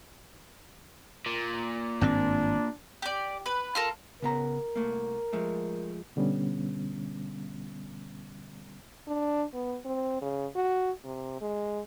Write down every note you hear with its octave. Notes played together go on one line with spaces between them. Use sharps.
A#2
G#1 G2 C4 D4
G4 D5
B4
F4 A4 A#4
C#3 B3 A#4 A#5
C2 A3 A#3
F3 G#3 A3
B2 D3 G3 B3 C#4
D4
B3
C4
C#3
F#4
C3
G#3